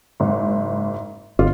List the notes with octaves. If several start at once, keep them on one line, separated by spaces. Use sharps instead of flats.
F#1 G#2
G1 F4